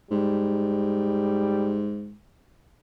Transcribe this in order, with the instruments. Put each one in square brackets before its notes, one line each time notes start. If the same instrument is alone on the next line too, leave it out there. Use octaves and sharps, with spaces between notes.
[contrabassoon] G#2 [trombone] G3